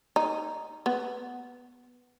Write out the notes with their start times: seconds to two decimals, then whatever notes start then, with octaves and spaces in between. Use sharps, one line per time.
0.16 D#4
0.86 B3